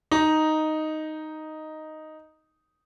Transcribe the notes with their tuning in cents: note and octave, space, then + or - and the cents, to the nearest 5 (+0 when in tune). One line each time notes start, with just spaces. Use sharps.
D#4 +0 D#5 +0